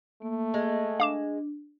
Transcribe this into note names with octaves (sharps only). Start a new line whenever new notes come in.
A3 A#3
G#3
D4 F5 D6 E7